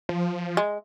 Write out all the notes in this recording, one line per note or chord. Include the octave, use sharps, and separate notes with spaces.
F3
G#3